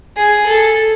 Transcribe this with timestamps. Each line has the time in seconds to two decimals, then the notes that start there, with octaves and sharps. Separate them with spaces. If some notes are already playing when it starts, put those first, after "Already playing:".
0.17 G#4
0.48 A4